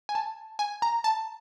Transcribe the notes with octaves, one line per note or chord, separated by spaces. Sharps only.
G#5
A5
G#5
A#5
A5